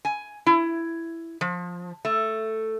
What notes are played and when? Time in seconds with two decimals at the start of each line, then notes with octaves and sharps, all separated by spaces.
0.05 G#5
0.46 E4
1.41 F3
2.05 A3